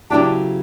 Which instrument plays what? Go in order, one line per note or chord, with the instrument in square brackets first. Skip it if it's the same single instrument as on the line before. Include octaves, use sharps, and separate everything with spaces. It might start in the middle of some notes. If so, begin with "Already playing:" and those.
[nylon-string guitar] C#3 F#3 B3 E4 G4 [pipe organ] D4